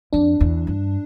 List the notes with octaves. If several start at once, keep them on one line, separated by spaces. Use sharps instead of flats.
F2 D4
E2
G2